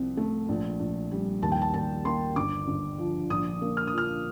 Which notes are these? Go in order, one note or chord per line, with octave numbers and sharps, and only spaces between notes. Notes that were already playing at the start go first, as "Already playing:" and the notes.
Already playing: C2 F3 C4
A3
A#1
A#1
G3
D#2 A5
G5
A5
D#2 A5
A#3 C6
G1 D6
G1
F3
A#1 D#6
A#3
F6
D#6
F3 F6